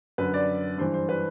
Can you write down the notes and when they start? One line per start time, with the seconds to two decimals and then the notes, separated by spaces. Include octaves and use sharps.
0.18 F#2 D3 B4
0.34 D5
0.78 G2 E3 C5
0.94 C5
1.09 B4